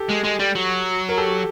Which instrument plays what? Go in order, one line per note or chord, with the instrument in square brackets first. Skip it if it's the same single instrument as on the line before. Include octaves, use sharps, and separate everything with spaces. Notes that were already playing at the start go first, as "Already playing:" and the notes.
Already playing: [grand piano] G4 A4
[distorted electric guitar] G#3
G#3
G3
F#3
[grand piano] A#4
G4 A4